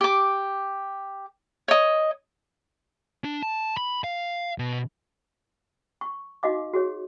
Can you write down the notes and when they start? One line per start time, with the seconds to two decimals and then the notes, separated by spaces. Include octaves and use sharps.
0.01 G4 D6
1.68 C#5 D#5
3.24 D4
3.43 A5
3.77 B5
4.04 F5
4.58 B2
6.01 C#6
6.43 D#4 F#4 D#5 F5 D6
6.74 F#4 G#4 C#5